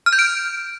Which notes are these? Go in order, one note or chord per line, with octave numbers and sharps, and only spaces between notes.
F6
G6
D7